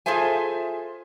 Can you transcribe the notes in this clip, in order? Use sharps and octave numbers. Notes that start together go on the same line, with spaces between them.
F4 G#4 A4 C5 E5 G#5